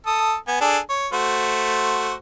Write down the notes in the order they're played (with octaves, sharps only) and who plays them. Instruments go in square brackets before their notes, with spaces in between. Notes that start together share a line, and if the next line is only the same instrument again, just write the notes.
[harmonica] A4 D#6
B3 G#5
D4 G#4 A4
C#5
A3 F#4 C5